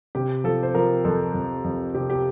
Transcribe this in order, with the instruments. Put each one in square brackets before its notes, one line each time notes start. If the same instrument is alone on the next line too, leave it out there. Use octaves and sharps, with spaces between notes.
[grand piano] C3 G4
F3 A4
C5
F3 A#4
F2 A4
F2
F2
C3 G4
G4